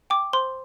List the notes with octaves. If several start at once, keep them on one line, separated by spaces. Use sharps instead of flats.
G5 D6
C5 C6